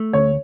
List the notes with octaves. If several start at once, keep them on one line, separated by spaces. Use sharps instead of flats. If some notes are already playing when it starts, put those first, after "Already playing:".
Already playing: A3
D2 C#5